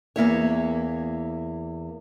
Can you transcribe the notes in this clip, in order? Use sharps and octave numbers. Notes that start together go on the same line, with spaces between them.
E2 A#3 E4 C#5